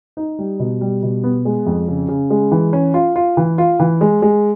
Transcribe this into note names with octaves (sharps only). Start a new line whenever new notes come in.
D#4
G3
B2
G3
B2
B3
G#3
F2
C#3
C#3
G#3
E3
C#4
F4
F4
E3
F4
E3
G#3
G#3